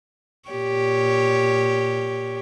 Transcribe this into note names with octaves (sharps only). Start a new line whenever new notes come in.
A#2 G4 C#5